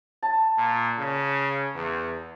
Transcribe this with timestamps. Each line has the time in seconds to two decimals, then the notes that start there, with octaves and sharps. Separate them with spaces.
0.23 A5
0.58 A#2
0.99 C#3
1.75 E2